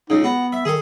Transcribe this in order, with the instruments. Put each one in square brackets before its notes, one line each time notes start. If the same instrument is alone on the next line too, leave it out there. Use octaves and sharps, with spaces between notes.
[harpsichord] C#2 C#3 [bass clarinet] D#4
[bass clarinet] B3 [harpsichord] F#4
[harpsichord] E5
[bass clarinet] D#3 [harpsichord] G#4 A4